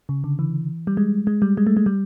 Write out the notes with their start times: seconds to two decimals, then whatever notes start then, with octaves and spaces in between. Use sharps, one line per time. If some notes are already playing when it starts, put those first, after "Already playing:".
0.09 C#3
0.24 D3
0.39 E3
0.87 G3
0.97 G#3
1.27 G#3
1.42 G3
1.57 G#3
1.67 A3
1.77 G#3
1.86 G3